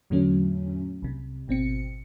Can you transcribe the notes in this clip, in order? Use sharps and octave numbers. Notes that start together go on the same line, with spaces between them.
E2 A2 D3 F#3 A3 C#4
C2 C3
G#1 B2 C4 C#7